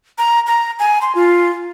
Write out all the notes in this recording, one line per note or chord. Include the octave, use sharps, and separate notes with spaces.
A#5
A#5
G#5
C6
F4